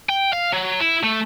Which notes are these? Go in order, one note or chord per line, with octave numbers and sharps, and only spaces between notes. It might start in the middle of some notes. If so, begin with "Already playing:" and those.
G5
F5
F#3
E4
A3